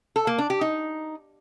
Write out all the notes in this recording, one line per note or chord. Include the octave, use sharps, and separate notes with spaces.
A4
A#3
D4
G4
D#4